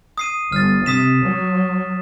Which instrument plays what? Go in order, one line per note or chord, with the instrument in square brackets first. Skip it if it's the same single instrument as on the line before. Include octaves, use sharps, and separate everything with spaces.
[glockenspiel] D#6 C7 D#7
[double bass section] G1 [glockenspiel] F6 A6
[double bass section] C3 [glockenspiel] D#6 B6 E7
[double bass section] F#3